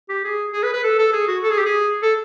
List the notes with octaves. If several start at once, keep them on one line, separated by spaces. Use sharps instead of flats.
G4
G#4
G#4
B4
B4
A4
A4
G#4
F#4
A4
G#4
G4
G#4
A4